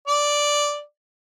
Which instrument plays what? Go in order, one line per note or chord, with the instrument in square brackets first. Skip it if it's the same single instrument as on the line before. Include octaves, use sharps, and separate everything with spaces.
[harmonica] D5